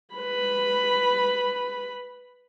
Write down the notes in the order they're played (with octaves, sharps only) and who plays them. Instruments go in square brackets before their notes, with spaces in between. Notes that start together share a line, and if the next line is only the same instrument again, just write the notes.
[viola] B4 B5